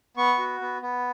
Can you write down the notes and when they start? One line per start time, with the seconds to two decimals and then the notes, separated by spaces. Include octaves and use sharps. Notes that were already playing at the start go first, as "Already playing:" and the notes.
0.17 B3 C#6
0.38 F#4
0.61 B3
0.82 B3